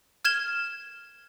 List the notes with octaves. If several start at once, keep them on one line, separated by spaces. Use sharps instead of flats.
F6 G#6 E7 G7